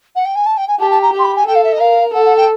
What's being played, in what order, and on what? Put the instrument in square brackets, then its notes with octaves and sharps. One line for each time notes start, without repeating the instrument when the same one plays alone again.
[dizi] F#5
G5
G#5
A5
G5
G#5
[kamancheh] G4 [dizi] A5
[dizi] A5
A#5
[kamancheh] G4
[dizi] C6
B5
G#5
[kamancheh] A4 [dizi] G5
[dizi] F5
E5
D#5
[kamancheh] A#4 [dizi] F5
[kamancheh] A4 [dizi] F#5
[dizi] F#5
G5